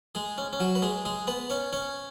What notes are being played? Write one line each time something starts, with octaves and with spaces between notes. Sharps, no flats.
G#3 G#4
C#4
C#4
F#3 F#4
B4
G#3 G#4
G#3 G#4
B3 B4
C#4 C#5
C#4 C#5